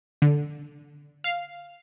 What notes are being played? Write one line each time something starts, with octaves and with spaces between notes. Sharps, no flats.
D3
F5